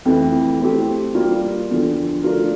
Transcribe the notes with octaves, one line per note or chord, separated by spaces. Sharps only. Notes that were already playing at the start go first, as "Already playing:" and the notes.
F2 E3 A3 E4
A3 C4 G4
G3 A#3 F4 A#4
E2 D3 F3
A3 D4 F4 A#4